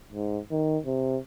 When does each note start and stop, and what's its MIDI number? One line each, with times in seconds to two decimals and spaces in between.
0.12 0.39 44
0.51 0.78 51
0.86 1.18 48